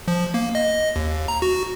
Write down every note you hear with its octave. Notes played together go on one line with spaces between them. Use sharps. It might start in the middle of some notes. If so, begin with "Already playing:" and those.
F3
A#3
D#5
D#2
A#5
F#4